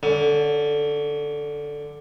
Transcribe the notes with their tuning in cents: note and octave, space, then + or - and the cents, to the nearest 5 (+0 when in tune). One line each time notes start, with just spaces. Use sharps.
D3 +0 C#4 +30